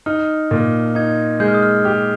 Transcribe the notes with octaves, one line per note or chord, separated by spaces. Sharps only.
D#4 F6
A#2
D#4 G#6
G#3 G6
F6
D#6
F6
G4 F6